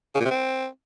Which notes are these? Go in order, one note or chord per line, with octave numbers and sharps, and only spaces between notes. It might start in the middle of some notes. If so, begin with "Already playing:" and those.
C#3
A#2
C3
C4